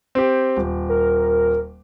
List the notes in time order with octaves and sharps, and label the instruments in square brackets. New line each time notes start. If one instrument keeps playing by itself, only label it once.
[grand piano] C4 G4
D#1
[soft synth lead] A#4